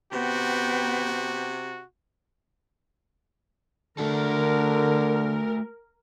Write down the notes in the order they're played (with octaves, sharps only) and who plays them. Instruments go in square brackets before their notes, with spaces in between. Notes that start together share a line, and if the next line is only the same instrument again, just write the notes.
[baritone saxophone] C3 [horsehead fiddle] B3 G5 [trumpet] F#4
[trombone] D3 [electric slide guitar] A3 F#4 A4 [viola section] A#4